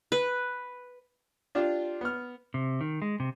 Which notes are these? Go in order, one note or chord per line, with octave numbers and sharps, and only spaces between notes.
B4
D4 F4 G4
B3 F6
C3
D#3
G#3
C3